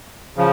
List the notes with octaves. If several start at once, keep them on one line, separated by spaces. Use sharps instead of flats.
C#3 F3